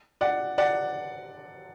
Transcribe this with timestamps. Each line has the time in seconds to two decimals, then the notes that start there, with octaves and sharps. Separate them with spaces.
0.21 D5 F#5
0.58 D5 F#5